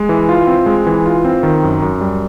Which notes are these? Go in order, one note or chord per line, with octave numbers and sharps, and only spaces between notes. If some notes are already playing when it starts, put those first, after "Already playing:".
Already playing: G#3
E3
F4
C4
G#3
E3
F4
C4
D#3
F#2
F#2
G3